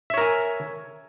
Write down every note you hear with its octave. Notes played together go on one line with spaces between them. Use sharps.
A#4 C#5 E5 G#5